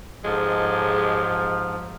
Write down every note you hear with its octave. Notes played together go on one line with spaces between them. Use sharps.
G#2 F3 G#3 G4 A4